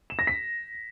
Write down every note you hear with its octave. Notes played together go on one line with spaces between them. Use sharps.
E7
A#6
B6